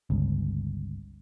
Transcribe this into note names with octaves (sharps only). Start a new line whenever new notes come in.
G1 C#2